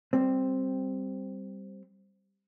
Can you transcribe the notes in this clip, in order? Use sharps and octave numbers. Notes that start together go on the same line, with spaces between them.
G3 C4